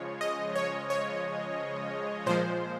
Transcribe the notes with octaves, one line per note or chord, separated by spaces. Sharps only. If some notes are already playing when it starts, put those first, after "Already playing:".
Already playing: C#3 F3 G#3 C#5
D#5
C#5
C#5
A#2 F3 G#3 C5